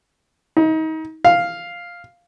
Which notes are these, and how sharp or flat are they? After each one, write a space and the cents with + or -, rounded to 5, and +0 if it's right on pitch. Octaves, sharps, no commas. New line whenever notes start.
D#4 +30
F5 +0